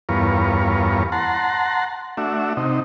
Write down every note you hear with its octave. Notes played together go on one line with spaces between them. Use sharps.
E2 G2 B3 F4 A#4 C#5
F#5 A5 A#5 C6
A3 D4 F#4 E5
C3 D#4